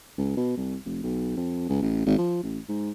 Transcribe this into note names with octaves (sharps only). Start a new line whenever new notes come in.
C#2
B2
C2
F1
B1
F2
C#2
A1
G#1
F3
A1
G#2